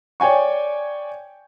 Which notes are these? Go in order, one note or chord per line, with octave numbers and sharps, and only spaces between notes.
C#5 D5 G5 G#5 C#6